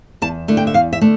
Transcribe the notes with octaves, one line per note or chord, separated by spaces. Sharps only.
E2 A5
D3 A3
G5
E5
E2 F5
E5
D3 A3